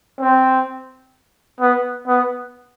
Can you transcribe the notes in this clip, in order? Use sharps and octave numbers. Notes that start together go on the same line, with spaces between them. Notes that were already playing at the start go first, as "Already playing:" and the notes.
C4
B3
B3